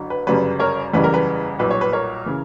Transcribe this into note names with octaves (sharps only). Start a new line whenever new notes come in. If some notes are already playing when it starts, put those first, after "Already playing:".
Already playing: F#1 D3 F#3
B4
G1 F#2 C#3 G3 B4
A#4 C#5
F#1 E2 C#3 E3 G3 B4
A#4
B4
B1 A#2 G3 B4
C#5
B4
A#4 C#5
C#3 E3